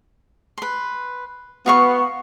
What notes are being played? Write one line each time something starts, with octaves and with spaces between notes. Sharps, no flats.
B4 C6
B3 F#4 F5 C#6